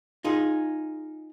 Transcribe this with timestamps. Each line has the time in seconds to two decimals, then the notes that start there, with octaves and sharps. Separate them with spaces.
0.24 D#4 F4 G#4